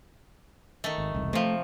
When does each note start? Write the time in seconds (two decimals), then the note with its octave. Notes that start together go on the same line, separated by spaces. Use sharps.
0.84 D#3 A3
0.98 G#1
1.15 E1 C2
1.33 C3 F3 A3